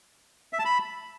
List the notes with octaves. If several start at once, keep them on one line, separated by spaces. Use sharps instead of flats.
E5
A5
B5